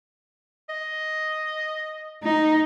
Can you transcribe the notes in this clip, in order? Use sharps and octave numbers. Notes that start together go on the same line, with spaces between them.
D#5
D#4